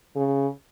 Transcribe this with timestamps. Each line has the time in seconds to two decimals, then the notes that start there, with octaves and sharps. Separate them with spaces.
0.16 C#3